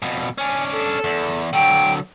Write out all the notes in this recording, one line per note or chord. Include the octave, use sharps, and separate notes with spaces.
F2 B2
C#4 D4 G#5
A4
E2
D3 F#3 G5